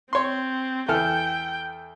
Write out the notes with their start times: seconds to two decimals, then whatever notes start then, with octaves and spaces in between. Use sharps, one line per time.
0.13 C4 C#5 C6
0.89 E2 A4 G5 F6